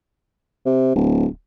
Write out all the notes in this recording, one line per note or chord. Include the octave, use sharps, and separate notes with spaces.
C3
D1